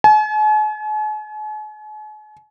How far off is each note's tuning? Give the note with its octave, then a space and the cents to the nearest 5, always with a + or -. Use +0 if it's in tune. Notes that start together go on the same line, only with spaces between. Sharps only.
G#5 +45